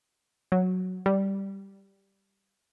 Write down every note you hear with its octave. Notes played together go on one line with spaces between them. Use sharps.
F#3
G3